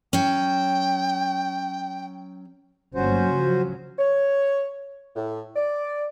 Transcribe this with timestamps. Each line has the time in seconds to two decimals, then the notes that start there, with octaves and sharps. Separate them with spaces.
0.13 F#3 C#4 G5
2.95 G1 F#3 A#3 C#4 F#4 C5
3.31 C#3 F3 F#3
3.98 C#5
5.15 A2
5.56 D5